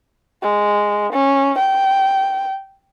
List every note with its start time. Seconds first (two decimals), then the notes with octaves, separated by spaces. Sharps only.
0.42 G#3
1.12 C#4
1.58 G5